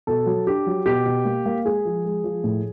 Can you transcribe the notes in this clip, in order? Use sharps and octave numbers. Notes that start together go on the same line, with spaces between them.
B2 A4
F#3
D4 G4
F#3
B2 G4
B2
A#3
A#3
G#3 G#4
F3
G#3
F3
A2